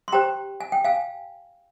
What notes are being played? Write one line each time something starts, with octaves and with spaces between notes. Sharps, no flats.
C6
G4 C5 G5 A#5
G#5
G5
F5 G#5